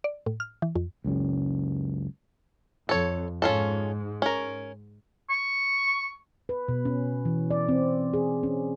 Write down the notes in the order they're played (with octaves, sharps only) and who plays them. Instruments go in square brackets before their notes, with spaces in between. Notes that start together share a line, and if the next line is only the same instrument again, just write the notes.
[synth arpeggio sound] D5
A2
F6
E3
F2
[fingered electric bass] C#2 F#2 C#3
[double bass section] F2 [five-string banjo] A4 C#5
[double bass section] G#2 [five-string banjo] C#4 F4 A4
[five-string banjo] C#4 A#4
[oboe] C#6
[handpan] B4
B2
C#4
E3
D5
C4
G#4
C#4